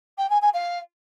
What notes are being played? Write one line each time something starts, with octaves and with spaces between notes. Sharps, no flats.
G5
G#5
G#5
F5